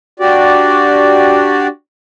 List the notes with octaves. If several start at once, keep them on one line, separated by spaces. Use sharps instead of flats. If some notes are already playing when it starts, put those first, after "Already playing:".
D4 F#4 G4 D5